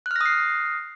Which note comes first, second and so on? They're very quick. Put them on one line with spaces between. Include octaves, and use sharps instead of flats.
F#6 F6 A#6 D#6 C7